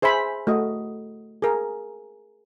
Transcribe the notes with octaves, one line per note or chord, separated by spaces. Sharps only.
G#4 C5 E5 G#5 B5
A3 F#4 D#5
G#4 A#4